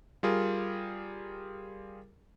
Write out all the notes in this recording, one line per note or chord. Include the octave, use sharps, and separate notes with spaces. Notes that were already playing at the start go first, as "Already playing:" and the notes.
G3 F4 G#4 A#4